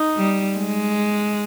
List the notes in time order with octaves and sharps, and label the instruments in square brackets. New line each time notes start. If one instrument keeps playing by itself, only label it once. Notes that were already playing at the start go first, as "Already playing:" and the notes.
Already playing: [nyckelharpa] D#4
[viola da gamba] G3
G#3